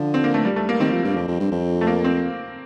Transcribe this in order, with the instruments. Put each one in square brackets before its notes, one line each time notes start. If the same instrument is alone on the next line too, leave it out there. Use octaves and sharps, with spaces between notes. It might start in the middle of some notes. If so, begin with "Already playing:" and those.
Already playing: [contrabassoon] D3 [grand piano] F3
[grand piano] C4
A#3
A3
G3
A3
A#3
[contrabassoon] D#3 [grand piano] C4
[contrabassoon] F3
G2
F2
F2
G2
F2
[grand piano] A3
A#3
C4